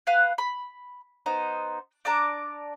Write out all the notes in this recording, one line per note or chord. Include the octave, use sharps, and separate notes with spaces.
B4 F5 F#5
B5
B3 D#4 C5
D4 D5 A5 A#5